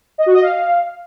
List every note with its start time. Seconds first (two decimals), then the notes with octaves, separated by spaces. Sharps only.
0.18 D#5
0.26 F#4
0.34 D#5
0.42 F5